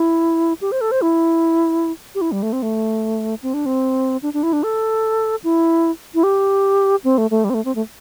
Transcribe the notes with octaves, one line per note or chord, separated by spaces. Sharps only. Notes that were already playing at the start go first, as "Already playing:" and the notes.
Already playing: E4
G4
C5
A4
C5
E4
G4
E4
G3
A3
C4
A3
C4
D4
C4
D4
D4
E4
D4
A4
E4
E4
G4
C4
A3
A3
G3
C4
A3
C4
A3